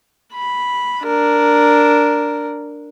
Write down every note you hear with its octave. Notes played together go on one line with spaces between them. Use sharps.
B5
D4 A#4